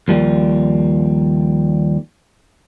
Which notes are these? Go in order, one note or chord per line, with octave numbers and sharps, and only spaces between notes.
D#2 F3 G3 A#3